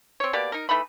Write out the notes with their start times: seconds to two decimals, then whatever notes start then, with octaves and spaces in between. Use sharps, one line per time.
0.20 C4 C#5
0.33 B2 A#3 G4 D5
0.52 D#4 A#4
0.69 E3 A3 D#4 B5